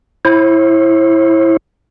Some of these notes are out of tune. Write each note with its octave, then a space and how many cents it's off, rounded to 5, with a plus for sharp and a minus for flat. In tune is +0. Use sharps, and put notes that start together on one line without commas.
E4 +0 C5 +45